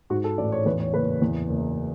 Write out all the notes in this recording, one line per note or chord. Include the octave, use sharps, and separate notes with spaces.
G#2 F#4
A4
A1 D5
C#5
E2 B4
C#5
F#1 B4
E2
F#1